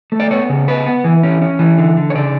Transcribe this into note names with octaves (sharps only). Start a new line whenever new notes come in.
A3
D5
B3 C#5
C#3
B3 B4
B3
E3
C#4
C#4
E3
D3
D3
C#5
C#3 D5